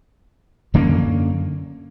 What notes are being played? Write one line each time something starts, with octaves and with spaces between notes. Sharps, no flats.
F#2 D3 A#3 C#4